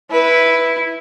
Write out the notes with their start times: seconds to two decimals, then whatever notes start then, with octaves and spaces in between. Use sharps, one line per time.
0.11 E4 B4